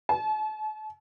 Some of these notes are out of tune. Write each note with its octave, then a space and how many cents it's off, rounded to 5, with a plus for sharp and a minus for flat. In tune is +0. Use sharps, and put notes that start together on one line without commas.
A5 -40